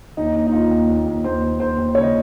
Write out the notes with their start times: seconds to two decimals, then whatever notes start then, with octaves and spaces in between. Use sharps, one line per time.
0.17 D#2 D#4
0.35 D#2
0.47 D#4
0.52 D#2 F4
0.71 D#2
0.89 D#2
1.06 D#2
1.24 D#2 C5
1.42 D#2
1.59 D#2 C5
1.78 D#2
1.95 C#3 C#5
2.03 D#5